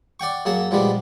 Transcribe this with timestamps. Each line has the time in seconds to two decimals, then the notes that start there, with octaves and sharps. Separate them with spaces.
0.20 D5 F#5 G5 C#6
0.45 F#2 A#3 G#4 F#5 A5
0.71 A#2 F3 G3 G#3 B3 D4